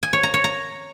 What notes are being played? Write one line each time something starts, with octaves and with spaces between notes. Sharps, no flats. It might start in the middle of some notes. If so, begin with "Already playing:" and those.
G#5
C#5
A#5
C#5
A#5